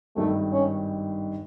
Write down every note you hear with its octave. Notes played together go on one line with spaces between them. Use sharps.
G#1 G2 D#3 A3
C#4